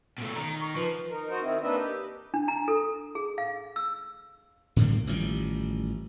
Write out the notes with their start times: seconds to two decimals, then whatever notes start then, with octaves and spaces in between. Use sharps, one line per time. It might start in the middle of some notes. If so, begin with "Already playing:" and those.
0.18 B2 A3
0.36 D#3 A#5
0.60 C#6
0.76 F3 B4
1.10 D#4 A#4
1.30 D#4 F#4 C5 D#5
1.42 D#3 C4 E4
1.63 A#3 D4 D#4 B4 D#5 E5
1.76 G4
2.34 D4
2.48 A#5
2.68 A4
3.15 G#4
3.38 F5
3.76 E6
4.76 A2 D3 G3 A#3
5.07 A1 D#3 F3 G3